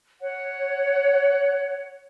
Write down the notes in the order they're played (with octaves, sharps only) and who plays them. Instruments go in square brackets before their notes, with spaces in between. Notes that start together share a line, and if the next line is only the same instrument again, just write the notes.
[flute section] C#5 F#5